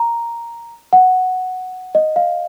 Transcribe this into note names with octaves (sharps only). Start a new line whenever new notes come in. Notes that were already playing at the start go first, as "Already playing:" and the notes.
Already playing: A#5
F#5
D#5
F5